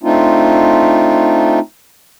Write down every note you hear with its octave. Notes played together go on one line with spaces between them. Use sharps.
A3 C4 D4 D#4 F4